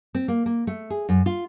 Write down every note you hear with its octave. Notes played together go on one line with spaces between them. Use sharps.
C4
A#3
A#3
A3
G#4
F#2
F4